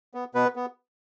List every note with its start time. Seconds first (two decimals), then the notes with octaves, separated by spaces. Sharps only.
0.14 B3
0.35 B2 B3 B4
0.56 B3